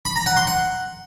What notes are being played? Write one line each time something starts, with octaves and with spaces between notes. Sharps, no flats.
B5
A#5
F#5
C6
F#5